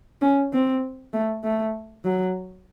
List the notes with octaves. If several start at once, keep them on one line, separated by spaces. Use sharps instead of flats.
C#4
C4
A3
A3
F#3